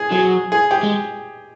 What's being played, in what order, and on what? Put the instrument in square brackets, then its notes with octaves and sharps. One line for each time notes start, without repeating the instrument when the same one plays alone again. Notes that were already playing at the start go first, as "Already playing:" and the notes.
Already playing: [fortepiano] G#4
[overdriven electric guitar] F#3 [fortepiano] G#4
[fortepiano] G#4
G4
[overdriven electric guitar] G#3